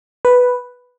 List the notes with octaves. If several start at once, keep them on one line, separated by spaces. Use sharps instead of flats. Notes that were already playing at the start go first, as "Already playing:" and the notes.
B4